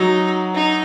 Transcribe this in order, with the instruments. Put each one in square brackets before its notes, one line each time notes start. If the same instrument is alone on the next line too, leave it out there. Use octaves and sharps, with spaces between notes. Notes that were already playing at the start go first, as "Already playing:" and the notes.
Already playing: [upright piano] F#3 [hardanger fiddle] D#4
[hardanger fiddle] D#4